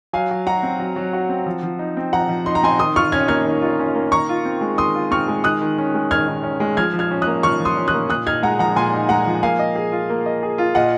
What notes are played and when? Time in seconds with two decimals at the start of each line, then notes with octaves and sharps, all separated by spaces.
0.13 F#3 F5 G#5
0.31 F#3
0.47 F#4 F#5 A#5
0.63 C4
0.80 F#3
0.96 F#3
1.13 F#4
1.29 C4
1.46 F3
1.63 F3
1.79 D#4
1.97 C4
2.13 F3 F#5 A#5
2.29 F3
2.46 D#4 C6
2.55 A#5
2.63 C4 G#5 C6
2.79 D#3 C6 D#6
2.96 F4 C#6 F6
3.12 C#4 F6 G#6
3.28 A#3 F6 G#6
3.45 D#3
3.61 F4
3.79 C#4
3.95 A#3
4.11 D#3 A#5 C#6
4.29 F4
4.45 C4
4.61 G#3
4.78 D#3 C6 D#6
4.95 F4
5.11 C4 C#6 F6
5.28 G#3
5.44 D#3 D#6 F#6
5.61 D#3
5.78 C#4
5.95 G#3
6.11 D#3 F6 G#6
6.28 D#3
6.43 C#4
6.60 G#3
6.77 F3 F6 G#6
6.93 F3
6.99 F6 G#6
7.11 C#4
7.22 A#3 D#6 F#6
7.43 F3 C#6 F6
7.60 F3
7.65 C6 D#6
7.77 C#4
7.88 D#6 F#6
7.94 A#3
8.09 A#2 D#6 F#6
8.26 D#4 F6 G#6
8.43 G#3 F#5 A#5
8.59 F3 F#5 A#5
8.76 A#2 G#5 C6
8.93 D#4
9.09 G#3 F#5 A#5
9.26 F3
9.43 A#3 F5 G#5
9.59 D#5
9.76 G#4
9.92 F4
10.10 A#3
10.26 D#5
10.43 G#4
10.58 F4
10.75 A#2 D#5 F#5